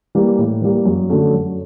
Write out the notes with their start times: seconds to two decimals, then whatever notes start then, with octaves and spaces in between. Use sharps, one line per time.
0.15 E3 G3 A#3
0.38 A2
0.61 E3 G3 A#3
0.85 F#2
1.09 D3 F#3 A3 C#4
1.33 F#2